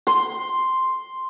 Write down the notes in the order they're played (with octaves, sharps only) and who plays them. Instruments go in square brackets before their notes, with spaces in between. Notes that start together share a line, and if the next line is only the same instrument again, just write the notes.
[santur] C6